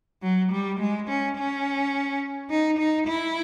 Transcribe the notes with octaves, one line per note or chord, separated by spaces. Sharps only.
F#3
G3
G#3
C#4
C#4
D#4
D#4
E4